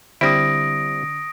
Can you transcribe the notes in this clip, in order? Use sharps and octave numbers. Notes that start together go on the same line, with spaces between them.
D3 G3 C4 E4 D#6 A#6 D7